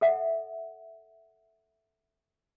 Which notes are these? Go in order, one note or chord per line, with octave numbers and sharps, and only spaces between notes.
A4 E5 F#5